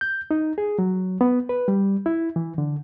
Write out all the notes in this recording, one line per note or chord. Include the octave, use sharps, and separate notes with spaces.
G6
D#4
G#4
F#3
B3
B4
G3
E4
E3
D3